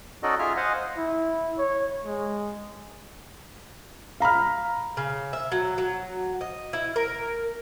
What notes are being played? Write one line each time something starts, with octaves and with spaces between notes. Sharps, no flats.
C#4 D#4 F#4 A4 D5 D#5
F4 G#4 E5 F6
C5 D#5 F5 F#5 G#5
E4
C#5
G#3
F5 A#5 B5 F6
C#3
E5
F#3
F#3
D#5
E4
A#4